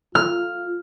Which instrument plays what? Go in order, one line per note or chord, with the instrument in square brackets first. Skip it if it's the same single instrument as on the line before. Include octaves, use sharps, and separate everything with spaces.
[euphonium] F4 [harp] F6